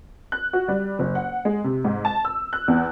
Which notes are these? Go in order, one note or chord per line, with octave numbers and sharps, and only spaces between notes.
F#6
F#4
G3
F#1
F#5
G#3
C3
G#2
A5
E6
F#6
E2